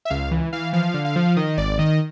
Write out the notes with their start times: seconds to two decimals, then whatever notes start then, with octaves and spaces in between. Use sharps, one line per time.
0.05 E5
0.10 C#2 F5
0.31 E3
0.53 E3 F5
0.73 F3 F5
0.94 D3
1.05 F5
1.16 F3
1.37 D#3 D#5
1.57 G#1 D5
1.79 D#3 D#5